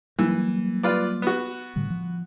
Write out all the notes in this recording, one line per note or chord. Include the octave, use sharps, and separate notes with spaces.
E3 F#3 G3 A#3
F4 B4 D5
B3 F#4
A2 D3 G3
F3